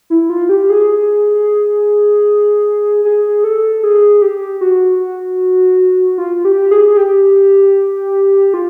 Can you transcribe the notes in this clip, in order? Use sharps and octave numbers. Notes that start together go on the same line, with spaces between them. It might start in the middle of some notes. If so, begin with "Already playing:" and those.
E4
F4
G4
G#4
G#4
A4
G#4
G4
F#4
F4
G4
G#4
G4
F4